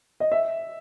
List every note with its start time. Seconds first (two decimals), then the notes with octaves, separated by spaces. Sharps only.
0.20 D#5
0.32 E5